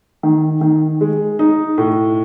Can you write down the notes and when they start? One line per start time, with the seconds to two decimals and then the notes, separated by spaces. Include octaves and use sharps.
0.23 D#3
0.61 D#3
1.01 G#3
1.39 D#4
1.78 A2